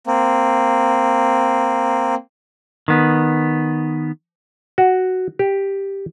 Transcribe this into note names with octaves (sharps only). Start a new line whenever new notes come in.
A#3 C4
D#3 B3
F#4
G4